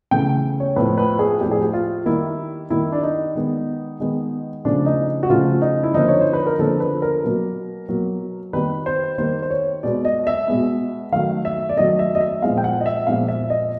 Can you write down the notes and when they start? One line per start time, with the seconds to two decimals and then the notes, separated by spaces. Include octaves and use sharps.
0.11 C#3 E3 A3 G5
0.60 C#5
0.76 A2 F3 A3 B4
0.98 B4
1.19 G#4
1.41 A2 F3 A3 G4
1.51 G#4
1.61 G4
1.73 F4
2.06 D#3 G3 A#3 E4
2.70 D#3 G3 A#3 E4
2.92 D4
3.03 D#4
3.35 D#3 G#3 B3
4.00 D#3 G#3 B3
4.65 C#3 F3 A3 D4
4.86 D#4
5.23 F#4
5.30 C#3 F3 A3 F4
5.62 D#4
5.83 E4
5.94 D3 F3 A#3 D#4
6.08 C#5
6.21 C5
6.33 B4
6.46 A#4
6.59 D3 F3 A#3 A4
6.80 B4
7.02 A#4
7.24 B2 F#3 A#3
7.89 B2 F#3 A#3
8.53 D#3 G3 A#3 B4
8.86 C5
9.18 D#3 G3 A#3 C5
9.42 C5
9.50 C#5
9.83 B2 G#3 B3 D5
10.05 D#5
10.27 E5
10.48 B2 G#3 B3
11.12 D#3 F#3 A3 F5
11.45 E5
11.69 D5
11.77 D#3 F#3 A3 D#5
11.99 E5
12.15 D#5
12.21 E5
12.42 A#2 F3 G#3 B3 F5
12.57 G5
12.64 F#5
12.81 D#5
12.86 E5
13.07 A#2 F3 G#3 B3 F5
13.28 E5
13.50 D#5